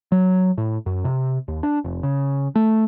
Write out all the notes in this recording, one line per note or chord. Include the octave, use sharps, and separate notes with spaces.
F#3
A2
F#2
C3
D#2
D4
F1
C#3
A3